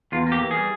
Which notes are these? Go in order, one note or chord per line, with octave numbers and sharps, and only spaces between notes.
E2 F4
A#3
G4
E3
G3 G#4